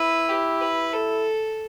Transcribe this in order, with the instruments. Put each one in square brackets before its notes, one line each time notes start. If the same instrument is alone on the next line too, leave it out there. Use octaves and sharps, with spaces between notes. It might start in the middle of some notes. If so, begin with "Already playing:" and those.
Already playing: [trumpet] E4 [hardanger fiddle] B4
[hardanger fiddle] G4
B4
A4